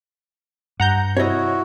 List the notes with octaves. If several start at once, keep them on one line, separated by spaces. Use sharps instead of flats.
G2 F#5 A#5 G6
C3 E4 F#4 C#5 D#5